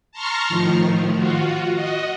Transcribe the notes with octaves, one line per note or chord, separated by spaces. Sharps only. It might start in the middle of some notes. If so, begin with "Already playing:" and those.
A5 A#5 C6 C#6 F6
A2 D#3 F3
F4 F#4
F#4 D#5